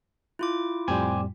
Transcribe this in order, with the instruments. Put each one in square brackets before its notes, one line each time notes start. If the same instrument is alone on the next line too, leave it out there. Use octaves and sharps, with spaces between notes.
[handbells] E4 F4 D6
[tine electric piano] F2 A2 G3 [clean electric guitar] G4 C5 G#5